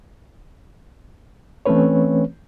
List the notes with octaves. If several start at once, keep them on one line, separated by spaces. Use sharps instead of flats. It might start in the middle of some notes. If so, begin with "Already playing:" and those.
E3 A3 C4 C#4 B4 C#5